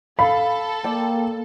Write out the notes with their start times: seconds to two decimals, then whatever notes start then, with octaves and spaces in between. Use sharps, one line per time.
0.19 A4 F5 B5
0.84 A#3 D5 G5